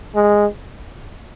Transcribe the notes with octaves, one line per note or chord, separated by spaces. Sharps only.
G#3